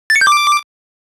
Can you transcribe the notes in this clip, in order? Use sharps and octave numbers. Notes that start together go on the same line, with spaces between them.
A6
C#7
G6
D6